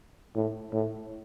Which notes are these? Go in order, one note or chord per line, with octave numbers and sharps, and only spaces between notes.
A2
A2